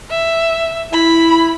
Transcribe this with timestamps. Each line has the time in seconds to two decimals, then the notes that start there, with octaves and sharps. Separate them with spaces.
0.10 E5
0.93 E4 B5